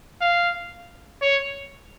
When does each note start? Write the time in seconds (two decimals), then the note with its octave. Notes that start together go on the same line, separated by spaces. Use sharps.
0.21 F5
1.22 C#5